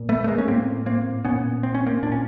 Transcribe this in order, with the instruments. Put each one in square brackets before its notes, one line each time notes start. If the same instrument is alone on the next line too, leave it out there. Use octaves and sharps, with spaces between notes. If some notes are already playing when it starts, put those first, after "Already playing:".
Already playing: [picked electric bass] A#2
A3 B3
A3
G#3 A#3
C#4
A2 A#3 C4
A#3 C4
A#2 B3 C#4
C4
C#4
A#3 C4
A#2 D4
C#4